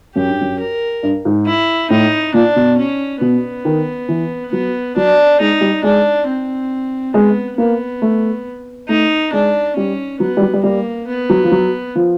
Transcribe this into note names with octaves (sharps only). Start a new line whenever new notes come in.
F#2 G4
G2
F#2
A#4
G2
G#2
E4
A2 D#4
A#2 D4
B2
C#4
B2 B3
D#3
E3
F#3 B3
F#3 D4
G#3 D#4
G3
G#3 D4
C4
G#3 B3
A#3 B3
A3
A3 D#4
G#3 D4
G3 C#4
F#3 B3
G3
F#3
G3
G3 A#3
B3
F#3
F3
F#3
F3